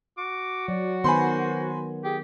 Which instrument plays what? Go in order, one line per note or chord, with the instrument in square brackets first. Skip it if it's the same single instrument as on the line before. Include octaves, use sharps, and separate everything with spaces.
[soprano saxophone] F#4 [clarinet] D6
[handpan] F#3 [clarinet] D5
[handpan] D#3 B3 [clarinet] C5 [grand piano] G#5 B5 C6
[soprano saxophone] G4 [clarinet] G#4